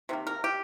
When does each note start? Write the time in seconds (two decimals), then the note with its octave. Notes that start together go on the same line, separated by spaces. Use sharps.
0.09 C3 D#3 A#3
0.27 A#4
0.44 G4